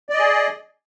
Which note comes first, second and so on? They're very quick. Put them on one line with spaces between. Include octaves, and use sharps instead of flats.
D5 D#5 G#4